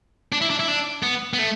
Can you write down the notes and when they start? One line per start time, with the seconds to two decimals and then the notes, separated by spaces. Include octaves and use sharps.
0.32 D4
0.41 E4
0.50 D4
0.59 E4
0.68 D4
1.03 B3
1.34 B3
1.39 A3